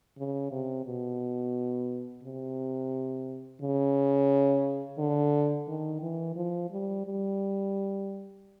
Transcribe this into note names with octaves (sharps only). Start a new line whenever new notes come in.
C#3
C3
B2
C3
C#3
D3
D#3
E3
F3
G3
G3